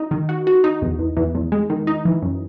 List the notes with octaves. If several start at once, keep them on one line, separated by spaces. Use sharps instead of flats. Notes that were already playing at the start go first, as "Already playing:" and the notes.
Already playing: D#4
D#3
F#4
F#4
D#4
E2
E2
E2
E2
G#3
D#3
D#4
E3
F#2